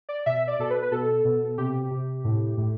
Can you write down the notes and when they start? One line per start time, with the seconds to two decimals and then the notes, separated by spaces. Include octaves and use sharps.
0.09 D5
0.26 B2 E5
0.47 D5
0.59 B2 A4
0.70 B4
0.82 B4
0.91 B2 A4
1.25 B2
1.58 C3 G4
1.91 C3
2.24 A2
2.58 A2